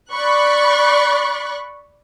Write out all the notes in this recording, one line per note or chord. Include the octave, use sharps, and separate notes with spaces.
D5 B5 C#6 F#6